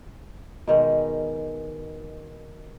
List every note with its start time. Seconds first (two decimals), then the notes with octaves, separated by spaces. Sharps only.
0.68 B2 D#3 G#3